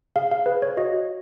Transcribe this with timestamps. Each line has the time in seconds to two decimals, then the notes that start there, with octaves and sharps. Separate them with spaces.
0.16 G#4 F5
0.31 F5
0.46 G#4 B4
0.62 C#5
0.77 F#4 D#5